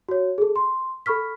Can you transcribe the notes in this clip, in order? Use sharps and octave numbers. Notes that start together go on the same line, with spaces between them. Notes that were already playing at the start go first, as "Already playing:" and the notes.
F#4 C#5
G#4 A4
C6
A4 B5 C#6 F6 B6